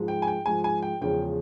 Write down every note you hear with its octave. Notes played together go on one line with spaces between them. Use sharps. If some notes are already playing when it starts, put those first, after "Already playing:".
Already playing: G#2 F3 G#3
G5
G#5
G5
G#2 F3 G#3 G#5
G#5
G5
E2 C#3 F3 G#3 G5